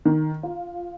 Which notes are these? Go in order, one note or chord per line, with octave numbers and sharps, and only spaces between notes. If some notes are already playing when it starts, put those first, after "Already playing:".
D#3
F4